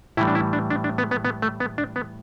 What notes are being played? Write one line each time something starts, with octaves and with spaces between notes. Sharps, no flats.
A2 E3 G3 E4
D4
E4
D4
D4
D4
B3
B3
B3
A3
B3
D4
B3